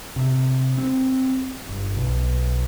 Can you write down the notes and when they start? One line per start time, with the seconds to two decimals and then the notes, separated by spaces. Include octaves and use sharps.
0.16 C3
0.78 C4
1.69 G1
1.96 B1